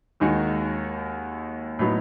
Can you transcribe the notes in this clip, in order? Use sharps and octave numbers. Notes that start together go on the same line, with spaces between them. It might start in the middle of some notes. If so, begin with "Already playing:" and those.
D#2 D#3 G#3 D#4 F#4
A2 F#3 B3 D#4